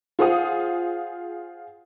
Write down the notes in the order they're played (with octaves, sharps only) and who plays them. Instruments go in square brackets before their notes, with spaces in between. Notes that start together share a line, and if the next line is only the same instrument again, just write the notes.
[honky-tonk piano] F4 G#4 C5 F5 F#5 D#6